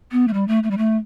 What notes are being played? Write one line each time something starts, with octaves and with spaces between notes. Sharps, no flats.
B3
A3
G3
A3
A3
G3
A3